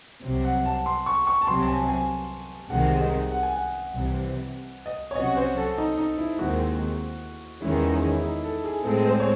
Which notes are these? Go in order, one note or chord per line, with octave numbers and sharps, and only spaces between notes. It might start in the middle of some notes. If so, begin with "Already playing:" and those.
C2 C3 F#3
F#5
A5
C6
C#6
C#6
A5
C2 C3 F#3 C6
A5
G#5
G#5
C2 C3 D#3 G#3 F#5
D#5
F#5
G#5
F#5
C2 C3 E3
D#5
C#5
C2 C3 F#3 C#4 F#4 D#5
C5
A4
D#4
D#4
E4
D#2 D#3 G#3 C4 F#4
E2 D#3 G#3 C#4 E4
D#4
E4
D#4
A4
G#4
A2 G#3 C4 A4
C5
C#5